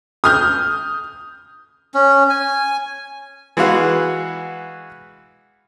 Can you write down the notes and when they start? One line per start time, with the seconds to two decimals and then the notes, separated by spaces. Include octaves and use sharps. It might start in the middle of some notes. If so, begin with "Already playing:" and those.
0.24 D#6 F6 G6
1.94 C#4
2.30 G#5
3.57 E3 G#3 B3 F#4 F5 F#5